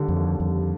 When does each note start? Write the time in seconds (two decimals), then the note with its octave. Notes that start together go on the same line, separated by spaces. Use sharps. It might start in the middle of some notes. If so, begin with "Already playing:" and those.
Already playing: D#2 D3 G3
0.08 F2
0.16 D#2
0.40 F2 G3